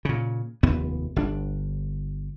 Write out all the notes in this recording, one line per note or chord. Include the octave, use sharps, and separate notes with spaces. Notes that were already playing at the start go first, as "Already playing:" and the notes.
A#2 C#3
F1 D#2 B3
G1 D4